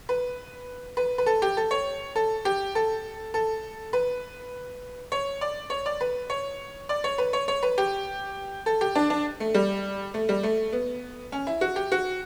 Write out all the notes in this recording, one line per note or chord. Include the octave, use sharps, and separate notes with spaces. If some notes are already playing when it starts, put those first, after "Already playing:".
B4
B4
B4
A4
G4
A4
C#5
A4
G4
A4
A4
B4
C#5
D5
C#5
D5
B4
C#5
D5
C#5
B4
C#5
C#5
B4
G4
A4
G4
D4
D4
A3
G3
A3
G3
A3
B3
C#4
E4
F#4
G4
F#4